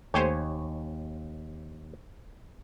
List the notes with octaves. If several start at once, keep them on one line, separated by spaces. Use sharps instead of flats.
D#2 A3 G4 C5 C#5 G#5